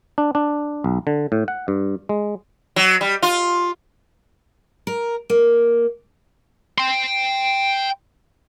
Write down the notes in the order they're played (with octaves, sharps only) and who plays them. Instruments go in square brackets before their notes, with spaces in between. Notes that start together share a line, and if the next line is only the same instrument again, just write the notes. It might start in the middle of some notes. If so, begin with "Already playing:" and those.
[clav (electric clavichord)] D4
D4
B1
D3
A2
F#5
G2
G#3
[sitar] F#3
G3
F4
[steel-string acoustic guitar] A#4
A#3
[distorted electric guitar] G5 C6